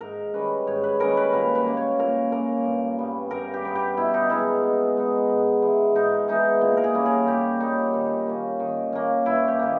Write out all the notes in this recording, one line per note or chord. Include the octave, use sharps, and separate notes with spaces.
G#2 A#4
D#3 G3 C#4 B4
G#2 C#5
B4
D#3 G3 C#4 A#4
B4
A#2 A#4
B4
A#3 C#4
C#5
A#2 A#4
A#3 C#4 A#4
G2
G3 B3
G2 A#4
G4
G3 B3
G4
B2 E4
D#4
G#3 B3 D#4 E4
B2
G#3 B3 D#4
G#2
E3 G#3 B3
G#2 D#4
E3 G#3 B3 D#4
A#2
A#4
G#4
G3 A#3 C#4
G#4
A#2 G4
G3 A#3 C#4 D#4
D#3
A#3 C#4
D#3
A#3 C#4
G2 E4
G4
D#3 A#3